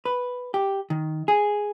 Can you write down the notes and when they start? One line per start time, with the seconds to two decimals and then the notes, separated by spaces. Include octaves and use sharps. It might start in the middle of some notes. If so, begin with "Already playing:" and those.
0.05 B4
0.54 G4
0.90 D#3
1.28 G#4